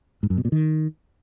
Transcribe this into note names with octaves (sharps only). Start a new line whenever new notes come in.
G#2
F#2
B2
A#2
D#3